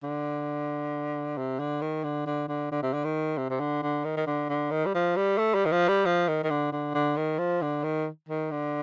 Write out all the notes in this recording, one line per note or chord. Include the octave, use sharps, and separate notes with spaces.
D3
C3
D3
D#3
D3
D3
D3
D3
C3
D3
D#3
C3
C3
D3
D3
D#3
D#3
D3
D3
D#3
G3
F3
G3
A3
G3
D#3
F3
G3
F3
D#3
D#3
D3
D3
D3
D#3
F3
D3
D#3
D#3
D3